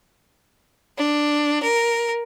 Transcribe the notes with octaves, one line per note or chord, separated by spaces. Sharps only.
D4
A#4